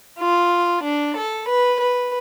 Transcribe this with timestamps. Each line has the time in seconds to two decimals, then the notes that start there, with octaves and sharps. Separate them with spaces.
0.18 F4
0.84 D4
1.16 A4
1.48 B4
1.81 B4